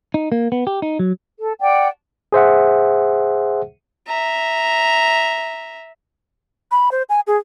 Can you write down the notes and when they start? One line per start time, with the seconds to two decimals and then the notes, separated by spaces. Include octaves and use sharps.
0.14 D#4
0.32 A#3
0.52 B3
0.67 G4
0.82 D#4
0.99 F#3
1.40 A4
1.60 D5 F#5 G5
2.32 G#4 C5 E5 F#5
4.07 E5 A#5
6.71 B5
6.92 C5
7.09 G#5
7.27 G#4